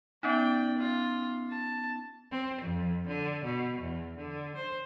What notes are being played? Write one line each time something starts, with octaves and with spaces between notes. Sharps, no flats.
B3 C#4 D#4 D5 G5
F4
A5
C4
F2
D3
B2
E2
D3
C5